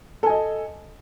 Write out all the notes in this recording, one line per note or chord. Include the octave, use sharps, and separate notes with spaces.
A4 D#5 G#5